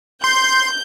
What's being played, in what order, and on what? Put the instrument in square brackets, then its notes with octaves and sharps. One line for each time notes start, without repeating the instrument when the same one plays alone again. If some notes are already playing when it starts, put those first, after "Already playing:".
[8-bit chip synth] C6 [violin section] G6